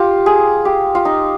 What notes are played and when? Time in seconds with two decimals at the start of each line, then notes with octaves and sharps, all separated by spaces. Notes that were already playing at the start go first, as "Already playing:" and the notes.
Already playing: F4 G4
0.26 G#4
0.65 G4
0.95 F4
1.05 D#4